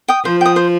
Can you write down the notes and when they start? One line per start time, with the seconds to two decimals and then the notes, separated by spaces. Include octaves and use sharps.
0.08 G5 D#6
0.25 F3 C5
0.41 G5 D#6
0.56 C5